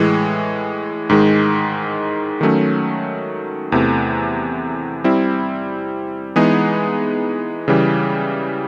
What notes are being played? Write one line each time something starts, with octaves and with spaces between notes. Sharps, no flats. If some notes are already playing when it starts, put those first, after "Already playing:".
Already playing: A2 E3 G#3
G#2 D#3 G#3
D#3 F#3 A3 C#4
E2 C3 E3 A3
G3 C4 E4
E3 G#3 B3 D#4 G#4
C#3 E3 G3